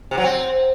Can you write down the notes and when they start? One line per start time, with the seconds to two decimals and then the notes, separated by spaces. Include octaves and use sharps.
0.11 C3
0.17 F#3
0.24 C4